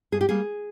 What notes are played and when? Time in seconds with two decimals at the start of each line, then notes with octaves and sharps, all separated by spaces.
0.12 G2 G#4
0.21 G4
0.29 G3 A#3 G#4